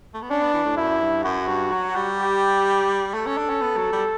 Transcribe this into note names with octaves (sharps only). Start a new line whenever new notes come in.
A3
B3
C#4 D4
B3
E3
A2
F#2 E4
G2
F#2 F#4
G2
F#3
G3
G4
A3 A4
C#4
D4
C#4
B3
F#3
G3